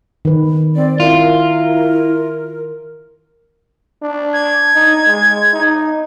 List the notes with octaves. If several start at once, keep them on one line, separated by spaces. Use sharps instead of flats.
D#3 B4
C4 D5
E4 F4 A#4
D4
G#6
D#4
G#3
D#4